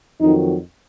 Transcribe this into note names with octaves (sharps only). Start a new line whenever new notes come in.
F2 D#3 F#3 D#4